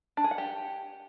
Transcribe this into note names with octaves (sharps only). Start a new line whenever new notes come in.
D4
G#4
F#5
G4